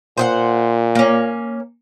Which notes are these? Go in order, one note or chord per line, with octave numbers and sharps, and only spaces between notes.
A#2 C5 D#5 F#5
A#3 C#4